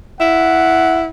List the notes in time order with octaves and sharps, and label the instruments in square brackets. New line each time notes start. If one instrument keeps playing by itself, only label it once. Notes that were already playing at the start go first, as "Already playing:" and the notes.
[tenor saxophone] E4 [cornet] F#5